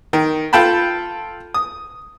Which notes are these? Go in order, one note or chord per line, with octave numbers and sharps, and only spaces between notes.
D#3
F4 A4 G5 A5 B5
D#6